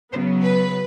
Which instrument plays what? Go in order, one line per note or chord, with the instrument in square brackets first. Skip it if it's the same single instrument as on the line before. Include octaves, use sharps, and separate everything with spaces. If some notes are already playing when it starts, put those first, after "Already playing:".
[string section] C#3 F#3 B3 C5
B4